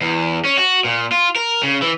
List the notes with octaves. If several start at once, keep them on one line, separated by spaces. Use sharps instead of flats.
E2
C#4
F#4
A#2
F4
A#4
C#3
E3